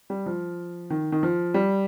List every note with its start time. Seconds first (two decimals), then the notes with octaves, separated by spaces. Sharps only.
0.10 G3
0.26 F3
0.90 D#3
1.12 D#3
1.23 F3
1.54 G3